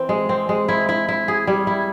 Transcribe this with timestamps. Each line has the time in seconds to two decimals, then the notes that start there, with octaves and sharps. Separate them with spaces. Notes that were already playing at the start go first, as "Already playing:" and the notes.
Already playing: E3 C4
0.09 G#3
0.29 C4
0.49 G#3
0.69 E4
0.89 E4
1.08 E4
1.28 G#4
1.47 G3
1.67 E4